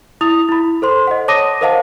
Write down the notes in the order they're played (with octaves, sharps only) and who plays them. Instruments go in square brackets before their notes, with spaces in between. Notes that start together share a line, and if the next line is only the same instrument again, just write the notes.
[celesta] E4 D#6 F7
E4 B5
A4 C5 C6
D#5 F#5
C#5 A5 D6 D#6 A#6 D#7
A#4 C5 D#5 F5 F#5 A5